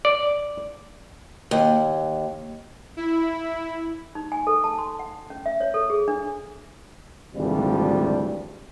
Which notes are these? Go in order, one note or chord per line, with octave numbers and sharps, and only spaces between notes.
D5
D#2
E4
D#4
G#5
A4
A5
C6
F#5
C#4
E5
C#5
A4
G#4
D4
G#1 D2 C3 E3 F3 G3